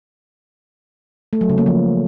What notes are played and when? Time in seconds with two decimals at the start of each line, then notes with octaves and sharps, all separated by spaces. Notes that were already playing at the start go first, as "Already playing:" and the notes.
1.33 A3
1.41 F#3
1.49 C#3
1.58 A#3
1.66 F3